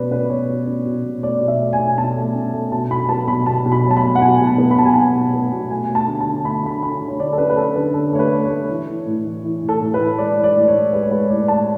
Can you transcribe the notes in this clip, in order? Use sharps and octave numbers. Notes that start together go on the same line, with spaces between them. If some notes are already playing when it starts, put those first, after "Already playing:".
Already playing: B2 C#4 B4 D5
C#4 B4
B2 C#5
B2
C#4
B2
B2
A3 D5
B2
E5
A3
G#5
B2
B2 A5
A3
C#4
A3
B2 A5
B2 B5
B3 A5
B2 B5
B2 A5
B2
B5
F#3
A5
B5
F#3
F#5
B2 G#5
B2
A5
B3
B5
F#3 A5
G#5
B2 A5
B2
B3
B2
A3 G#5
A3
A5
D3
A5
D3
A3 B5
D3 B5
D3 B5
D3
C#5
D3 D5
A4
C#4 B4
B4
C#4 A4
D3 B4
D3 A4
A3 C#5
B4
A3
C#5
A3
E3
E3
A2
E3
E3
A2
A4
A2
B4
E3
G#3 D5
E3
D5
A2
C#5
A2
G#3 B4
C#5
G#3 B4
A2 D5
A2 A5